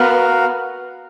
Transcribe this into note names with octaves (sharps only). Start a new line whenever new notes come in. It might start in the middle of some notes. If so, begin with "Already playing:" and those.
Already playing: B3 F#4 A#4 F5